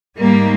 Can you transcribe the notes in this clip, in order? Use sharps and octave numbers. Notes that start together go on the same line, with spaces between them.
G#2 D#3 G3 A#3